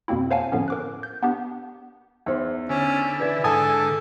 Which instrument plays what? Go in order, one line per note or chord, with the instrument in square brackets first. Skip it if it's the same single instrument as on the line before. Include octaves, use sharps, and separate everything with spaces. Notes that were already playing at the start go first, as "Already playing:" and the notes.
[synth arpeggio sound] F2 B2 A#3 C4 E4
C5 C#5 F5 F#5 G#5 A5
A2 D3 F3 B3 C#4
A#4 D6 F#6
G6
B3 D4 G4
[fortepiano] E2 [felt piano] D#4 C5
[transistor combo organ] D3 E4 [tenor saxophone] C#4
[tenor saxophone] E3 [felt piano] B4 D5 G#6
[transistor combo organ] G#2 D3 [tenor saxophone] A4 [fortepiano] G#5 A5 D#6